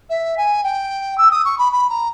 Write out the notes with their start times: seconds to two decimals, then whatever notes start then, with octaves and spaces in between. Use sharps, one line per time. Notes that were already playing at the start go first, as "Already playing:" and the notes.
0.09 E5
0.37 G#5
0.63 G5
1.17 E6
1.31 D#6
1.44 C#6
1.58 B5
1.72 B5
1.89 A#5